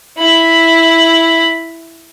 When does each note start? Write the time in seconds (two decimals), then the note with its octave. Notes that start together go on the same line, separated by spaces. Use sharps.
0.18 E4 B5